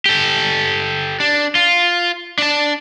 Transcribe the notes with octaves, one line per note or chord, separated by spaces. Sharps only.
G4 A4
D4
F4
D4 A5